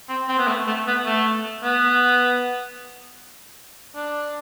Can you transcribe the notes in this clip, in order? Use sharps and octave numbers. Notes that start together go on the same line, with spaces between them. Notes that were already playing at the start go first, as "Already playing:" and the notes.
C4
C4
B3
A3
A3
B3
A3
B3
D4